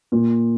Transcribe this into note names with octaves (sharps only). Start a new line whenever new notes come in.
A#2